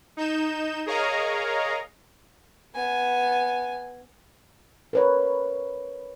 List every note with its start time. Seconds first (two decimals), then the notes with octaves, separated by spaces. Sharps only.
0.17 D#4 G6 E7
0.86 G#4 A#4 C#5 D#5 F5 A#5
2.75 B3 G#5
4.93 A#4 B4 C#5